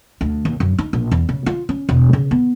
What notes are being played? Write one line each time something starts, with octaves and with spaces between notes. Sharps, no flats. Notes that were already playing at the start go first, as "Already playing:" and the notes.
D2
D#2
F#2
D#4
A#1
E2
C#3
F4
C#4
E1
C#3
B3